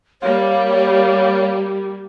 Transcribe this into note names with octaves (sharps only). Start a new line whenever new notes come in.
G3 A#3 G4 C#5 F5